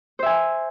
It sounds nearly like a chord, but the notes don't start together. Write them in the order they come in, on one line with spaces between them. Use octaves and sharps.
C5 E5 G#5